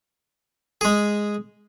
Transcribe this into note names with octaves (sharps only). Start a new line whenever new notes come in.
G#3 G#4